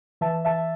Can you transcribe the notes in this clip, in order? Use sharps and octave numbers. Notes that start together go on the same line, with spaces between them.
E3 E5 A5
E3 E5 A5